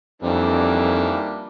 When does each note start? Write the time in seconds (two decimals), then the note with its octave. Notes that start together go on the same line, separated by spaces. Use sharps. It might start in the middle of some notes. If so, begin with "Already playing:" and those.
0.22 F2 D#3 E3 G3 A#3 D4